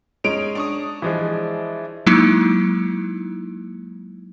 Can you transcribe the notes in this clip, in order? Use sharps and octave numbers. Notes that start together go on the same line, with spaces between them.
G#3 C#4 D#4 D7 F7
D4 C#6 D#6
E3 F3 G#3
F#3 G#3 A#3 D#4 E4